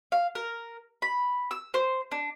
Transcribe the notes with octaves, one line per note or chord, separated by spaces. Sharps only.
F5
A#4
B5
E6
C5
D4